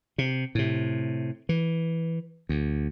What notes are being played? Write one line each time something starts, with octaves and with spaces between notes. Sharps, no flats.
C3
A2 C3
E3
D2